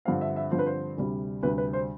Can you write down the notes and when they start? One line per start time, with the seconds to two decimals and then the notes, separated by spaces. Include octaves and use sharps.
0.05 G2 D3 F3 C4 F5
0.21 E5
0.36 E5
0.51 G2 D3 F3 C4 C5
0.59 B4
0.66 C5
0.98 D2 C3 G3
1.43 D2 C3 G3 B4
1.58 B4
1.73 C5